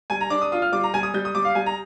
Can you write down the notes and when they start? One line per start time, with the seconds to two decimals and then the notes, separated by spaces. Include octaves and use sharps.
0.10 G3 G#5
0.21 A#5
0.30 D4 D6
0.41 D#6
0.52 F4 D#6
0.62 F6
0.72 G3 D6
0.83 A#5
0.94 G3 G#5
1.03 D#6
1.14 G3 G6
1.25 D#6
1.35 G3 D6
1.45 F5
1.55 G3 G#5
1.66 A#5